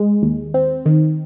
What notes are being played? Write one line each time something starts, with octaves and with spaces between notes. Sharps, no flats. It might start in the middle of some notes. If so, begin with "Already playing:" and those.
Already playing: G#3
D#2
C4
D#3